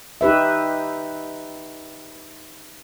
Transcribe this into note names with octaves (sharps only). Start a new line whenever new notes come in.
D#4 G4 B4 E5